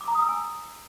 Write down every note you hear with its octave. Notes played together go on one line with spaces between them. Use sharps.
D6
A#5
D#6
E6
G#5